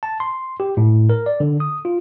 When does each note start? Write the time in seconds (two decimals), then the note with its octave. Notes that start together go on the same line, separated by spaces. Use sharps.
0.03 A5
0.20 C6
0.60 G4
0.77 A2
1.10 A#4
1.26 D5
1.40 D3
1.60 D#6
1.85 F4